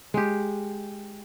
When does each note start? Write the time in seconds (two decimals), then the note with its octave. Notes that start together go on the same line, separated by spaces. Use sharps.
0.14 G#3 G4